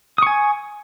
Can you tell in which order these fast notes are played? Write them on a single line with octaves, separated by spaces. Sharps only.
D#6 C#6 G#5